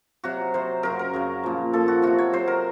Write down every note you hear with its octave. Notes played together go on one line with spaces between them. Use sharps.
C3 F#3 F#4
C3 F#3 C5
F#2 C#3 F#3 A#4
A#4
F#2 C#3 F#3
A#2 F3
A#2 F3 A4
F#4
C3 F#3 F#4
C#5
C3 F#3 C5
A#4